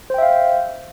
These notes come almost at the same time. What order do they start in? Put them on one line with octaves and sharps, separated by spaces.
C5 G5 E5 F5